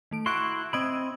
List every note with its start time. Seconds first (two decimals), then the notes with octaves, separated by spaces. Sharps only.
0.11 D#3 A3 D7
0.26 E4 F#4 C6 C#6 F#6 D7
0.73 C4 D#5 B5 E6 G#6 D7